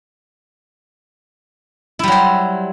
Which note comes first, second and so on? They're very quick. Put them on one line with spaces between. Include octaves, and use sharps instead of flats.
E4 G3 F#3 C5